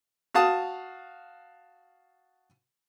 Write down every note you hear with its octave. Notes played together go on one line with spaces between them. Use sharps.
F#4 F5 A5 D#6